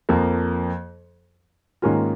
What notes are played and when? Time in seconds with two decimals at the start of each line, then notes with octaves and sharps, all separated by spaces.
0.09 F2 F3 A#3
1.82 G#2 D#3 A#3 C#4 F4